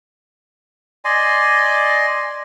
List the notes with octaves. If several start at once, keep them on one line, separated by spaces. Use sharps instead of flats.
D5 D#5 G#5 C6